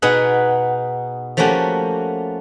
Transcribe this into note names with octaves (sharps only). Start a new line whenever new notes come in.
B2 B3 D#4 G#4 F#5
F3 A3 A#3 C#4 F#4 G4